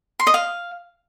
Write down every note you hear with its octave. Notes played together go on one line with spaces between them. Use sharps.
C6
D#5
F5